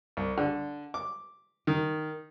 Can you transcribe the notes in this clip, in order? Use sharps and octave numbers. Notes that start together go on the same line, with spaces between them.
C2
D3
D6
D#3